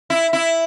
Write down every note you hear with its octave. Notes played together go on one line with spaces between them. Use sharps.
E4
E4